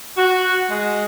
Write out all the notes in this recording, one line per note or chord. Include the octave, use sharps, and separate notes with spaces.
F#4
G#3